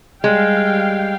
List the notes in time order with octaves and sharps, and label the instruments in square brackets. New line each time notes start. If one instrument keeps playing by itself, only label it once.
[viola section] G3 F5 G5 [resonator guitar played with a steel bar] G#3